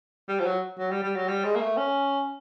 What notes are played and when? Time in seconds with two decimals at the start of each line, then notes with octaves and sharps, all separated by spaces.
0.28 G3
0.40 F3
0.45 F#3
0.78 F#3
0.91 G3
1.03 G3
1.15 F#3
1.28 G3
1.44 G#3
1.55 A#3
1.61 A3
1.77 C#4